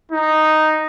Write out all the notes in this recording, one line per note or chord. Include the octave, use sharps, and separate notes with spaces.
D#4